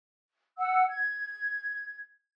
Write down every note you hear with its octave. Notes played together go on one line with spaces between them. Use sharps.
F#5 E6
G#6